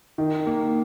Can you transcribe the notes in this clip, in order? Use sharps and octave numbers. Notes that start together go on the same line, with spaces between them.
D#3
A#3